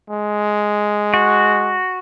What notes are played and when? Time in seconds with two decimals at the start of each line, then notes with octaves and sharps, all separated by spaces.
0.10 G#3
1.14 F#4